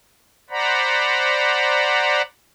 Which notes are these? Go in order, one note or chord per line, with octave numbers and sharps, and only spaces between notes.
C5 D5 F#5 A#5 B5